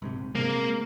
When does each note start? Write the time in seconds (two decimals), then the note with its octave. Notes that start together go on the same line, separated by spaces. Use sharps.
0.02 A#1 G#2 C3
0.35 C3 G#3 A#3